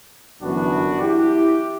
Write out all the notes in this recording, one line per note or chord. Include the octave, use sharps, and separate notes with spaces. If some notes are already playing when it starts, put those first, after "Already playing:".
G1 F#2 E3 B3 D4 F#4
E4 G4